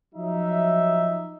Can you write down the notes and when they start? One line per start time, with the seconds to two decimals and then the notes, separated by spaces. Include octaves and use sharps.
0.14 F3 F#3 D#4 E5